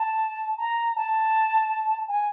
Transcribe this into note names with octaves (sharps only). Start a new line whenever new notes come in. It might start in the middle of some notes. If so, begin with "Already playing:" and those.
Already playing: A5
A#5
A5
G#5